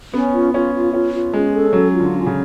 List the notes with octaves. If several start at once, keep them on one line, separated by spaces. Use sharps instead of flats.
B3 C#4
F4
C#4 F4
F4
C#4 F4
F4
G#3 C#4
A4
F#3 C#4
F4
D3
C#4
C#3